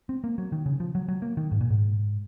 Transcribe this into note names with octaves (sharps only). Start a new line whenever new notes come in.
C4
A#3
F#3
D#3
C#3
F3
F#3
F#3
A#3
D#3
G#2
A#2
G#2